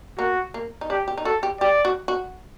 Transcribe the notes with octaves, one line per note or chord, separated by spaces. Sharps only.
A#3 F#4
A#3
D#4
D4 G4
G4
D#4
F#4 A4
G4
G4 D5
F#4
F#4